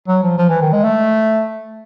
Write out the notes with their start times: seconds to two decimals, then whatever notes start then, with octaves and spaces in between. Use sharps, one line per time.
0.08 F#3
0.23 F3
0.38 F3
0.49 E3
0.62 D#3
0.73 G#3
0.84 A3